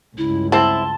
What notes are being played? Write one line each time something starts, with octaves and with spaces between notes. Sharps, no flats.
C#2 G2 E4
C4 E4 A5 C6